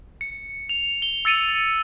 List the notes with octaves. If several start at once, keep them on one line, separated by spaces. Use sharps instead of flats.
C#7
F7
G7
E6 A6 C#7 D#7 F7